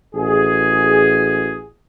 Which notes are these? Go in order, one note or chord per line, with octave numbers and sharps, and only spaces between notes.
A1 F#4 G#4